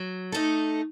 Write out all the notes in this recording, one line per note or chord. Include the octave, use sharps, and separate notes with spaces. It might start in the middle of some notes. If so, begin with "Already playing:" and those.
Already playing: F#3
A3 D#4 A4